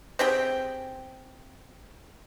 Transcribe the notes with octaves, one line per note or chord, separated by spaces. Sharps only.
C4 G4 G#4 G5